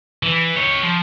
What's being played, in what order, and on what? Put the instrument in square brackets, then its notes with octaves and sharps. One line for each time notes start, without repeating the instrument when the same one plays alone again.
[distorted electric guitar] E3
G4 C#5
F3